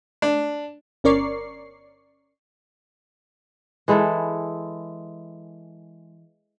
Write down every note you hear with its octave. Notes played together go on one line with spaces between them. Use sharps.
D4
G1 C#4 A#4 D5 C#6 C7
E3 G#3 E4 A4